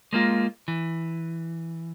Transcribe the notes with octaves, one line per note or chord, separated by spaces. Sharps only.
G#3 A#3 F4
E3